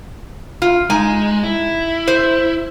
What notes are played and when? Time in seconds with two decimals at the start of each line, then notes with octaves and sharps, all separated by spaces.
0.62 F4
0.90 G#3 D#4 G#5
1.43 E4
2.08 C5